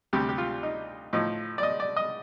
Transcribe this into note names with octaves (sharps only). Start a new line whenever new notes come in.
D2 C3 G3 G4
G4
F4
D#4
A2 F3 D#4
D5
D#5
D5
D#5